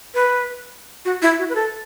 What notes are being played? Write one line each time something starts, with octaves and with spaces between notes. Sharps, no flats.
B4
F#4
E4
F#4
B4
A4